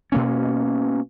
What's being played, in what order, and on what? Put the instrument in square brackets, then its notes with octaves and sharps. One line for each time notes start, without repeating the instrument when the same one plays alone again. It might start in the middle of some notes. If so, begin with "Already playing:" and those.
[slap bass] B2 A#3 C#4